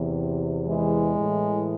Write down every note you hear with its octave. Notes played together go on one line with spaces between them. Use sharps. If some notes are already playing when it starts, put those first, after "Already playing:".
Already playing: E2 C3 E3
E3 G#3
A2 E3